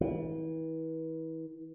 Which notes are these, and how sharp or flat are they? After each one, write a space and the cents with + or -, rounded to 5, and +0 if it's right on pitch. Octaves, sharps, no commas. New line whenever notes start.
E3 -35